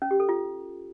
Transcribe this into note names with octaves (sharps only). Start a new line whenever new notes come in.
C#4
G4
A4
F4